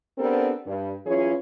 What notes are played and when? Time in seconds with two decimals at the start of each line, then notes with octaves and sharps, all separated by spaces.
0.18 B3 C4 D4 G4 A4 A#4
0.66 G2
1.06 E3 F#3 C#4 F4 G#4 C#5